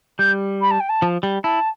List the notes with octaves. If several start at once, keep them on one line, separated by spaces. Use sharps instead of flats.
G3 G6
B5
A5
G5
A5
F3
G3
E4 A5